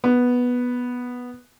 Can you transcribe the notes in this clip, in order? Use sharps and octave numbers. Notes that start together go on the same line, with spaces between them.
B3